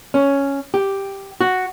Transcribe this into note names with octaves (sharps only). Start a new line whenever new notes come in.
C#4
G4
F#4